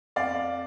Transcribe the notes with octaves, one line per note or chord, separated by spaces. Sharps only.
F2 D5 F5